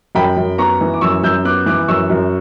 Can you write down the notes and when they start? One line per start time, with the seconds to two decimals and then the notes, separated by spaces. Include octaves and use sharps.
0.15 F#2 G5 B5
0.37 F#2
0.58 B3 A#5 C#6
0.81 E3
0.94 D6
1.01 F#2 C#6 E6
1.23 F#2 E6 G6
1.45 B3 D6 F#6
1.66 E3 D6 F#6
1.88 F#2 C#6 E6
2.10 F#2